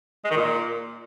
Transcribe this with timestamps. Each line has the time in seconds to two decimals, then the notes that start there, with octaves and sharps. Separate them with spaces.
0.25 G#3
0.31 D#3
0.37 A#2